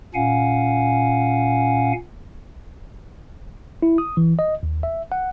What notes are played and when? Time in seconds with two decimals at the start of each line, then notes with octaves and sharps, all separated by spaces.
0.14 A#2 C#4 F5 F#5 G#5
3.82 E4
3.98 D#6
4.17 E3
4.39 D#5
4.63 D#2
4.83 E5
5.12 F#5